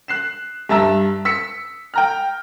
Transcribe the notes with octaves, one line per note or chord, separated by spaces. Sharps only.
F#6 C7 E7
G2 E5 A5 A#5 E6
E6 B6 C#7
G5 A#5 F6